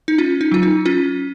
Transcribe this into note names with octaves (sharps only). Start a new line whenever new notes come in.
D#4
C#4 F4
D#4
F#3 F4
D#4
C#4 F4